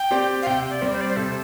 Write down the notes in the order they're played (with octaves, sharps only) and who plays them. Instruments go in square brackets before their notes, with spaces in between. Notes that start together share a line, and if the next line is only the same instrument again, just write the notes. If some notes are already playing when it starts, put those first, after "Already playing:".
Already playing: [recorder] G5
[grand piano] C4 G4 D5
[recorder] F5
[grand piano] C3 [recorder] G5
[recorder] D5
[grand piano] G3 C4
[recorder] C5
D5
C5
[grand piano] C3 [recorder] A4